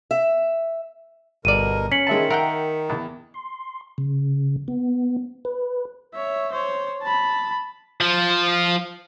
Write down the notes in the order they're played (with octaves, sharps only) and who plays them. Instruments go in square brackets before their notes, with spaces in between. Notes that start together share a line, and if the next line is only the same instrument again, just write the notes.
[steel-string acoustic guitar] E5
[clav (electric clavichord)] G1 D5 [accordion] B2 A#4 [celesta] D#7
[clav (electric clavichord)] C#4 [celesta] B6 C#7 F#7
[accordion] D#3 [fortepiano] G#3 E5 A5
[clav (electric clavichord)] A#4 F#5 G5 [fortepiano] E5
[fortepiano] E2
[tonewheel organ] C6
C#3
B3
B4
[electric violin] C#5 E5
C5 C#5
A5 B5
[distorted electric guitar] F3